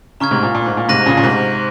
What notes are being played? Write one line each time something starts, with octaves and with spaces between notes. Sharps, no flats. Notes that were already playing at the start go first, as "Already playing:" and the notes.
C#3 A#5 C#6 F6 G#6
G#2 C3
A#2
A#2
G#2
A#2
G#2 C3 F#6 A#6 D#7 F#7
A#2 C#3
A#2
G#2 C3